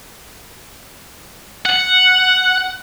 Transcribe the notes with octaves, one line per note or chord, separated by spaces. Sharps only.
F#5